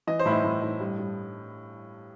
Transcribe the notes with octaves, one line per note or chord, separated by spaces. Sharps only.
E3 D#5
C5
A2 E4
D#4
A2
A2
G2
G2